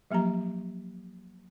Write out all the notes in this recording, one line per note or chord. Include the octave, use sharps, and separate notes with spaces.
F3 F#3 A#3 G4 A#5